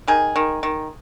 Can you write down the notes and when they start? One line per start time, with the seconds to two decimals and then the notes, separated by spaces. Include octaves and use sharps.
0.08 D#3 G#4
0.36 D#3
0.63 D#3